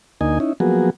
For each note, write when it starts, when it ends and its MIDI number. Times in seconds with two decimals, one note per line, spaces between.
0.21 0.39 38
0.21 0.39 58
0.21 0.39 63
0.21 0.39 75
0.21 0.39 80
0.40 0.53 61
0.40 0.53 63
0.40 0.53 64
0.60 0.90 53
0.60 0.90 54
0.60 0.90 58
0.60 0.90 59
0.60 0.90 66
0.60 0.90 68